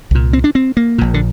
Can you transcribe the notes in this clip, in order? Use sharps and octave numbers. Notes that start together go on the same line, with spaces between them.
C2 A#2
C4
D4
C4
A#3
A#1 A#2
D3